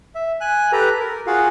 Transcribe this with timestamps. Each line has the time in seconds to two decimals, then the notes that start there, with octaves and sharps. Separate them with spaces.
0.15 E5
0.41 G#5 F#6
0.72 G4 A4 B4 A#5
1.00 A#4
1.27 F4 F#4 G#4 F5 F#5